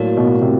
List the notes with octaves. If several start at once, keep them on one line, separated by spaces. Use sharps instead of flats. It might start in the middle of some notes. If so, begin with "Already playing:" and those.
Already playing: A2 F#3 A#3 D4
B2
C3